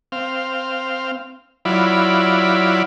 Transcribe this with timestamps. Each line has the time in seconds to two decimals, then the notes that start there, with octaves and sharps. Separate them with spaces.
0.12 C4 F5
1.65 F#3 E4 F4 D5 B5